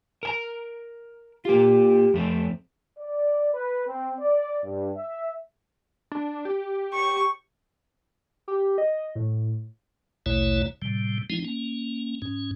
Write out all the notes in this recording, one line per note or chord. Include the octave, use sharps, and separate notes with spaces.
A#4 G#5 A#5
A#3 F4 G4
F2 A3 C4
D5
B4
C4
D5
G2
E5
D4
G4
C#6
G4
D#5
A2
A#1 D#2 B2 A3 E4 C#5
A2 C3 G3
F3 G#3 C4 D#4 E4
A#3 C#4
G#2 C#4